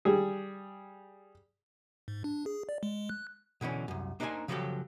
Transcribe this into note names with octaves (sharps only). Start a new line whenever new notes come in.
G3 G#4
G#2
D4
G#4
D5
G#3
F#6
B2 D3 E3 C#4
C2 F#2
A#3 D4 D#4 A#4 C5 G#5
C#3 F3 F#3 F#4 G4 A4